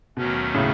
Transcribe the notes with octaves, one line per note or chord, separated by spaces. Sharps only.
D#2 B2 D#3 F#3 A3 C#4
A2 C#3